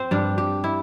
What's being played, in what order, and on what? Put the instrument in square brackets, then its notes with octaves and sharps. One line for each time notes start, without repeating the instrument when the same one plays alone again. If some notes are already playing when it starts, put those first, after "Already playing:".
Already playing: [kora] C4 C5
G2 G3 D4 G4
G4
E4